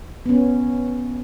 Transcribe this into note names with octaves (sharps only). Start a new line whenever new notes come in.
B3 C#4